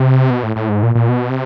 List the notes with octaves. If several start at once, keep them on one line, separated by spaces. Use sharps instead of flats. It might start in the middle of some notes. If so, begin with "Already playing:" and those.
Already playing: C3
B2
A2
A2
G#2
A#2
A#2
B2
C3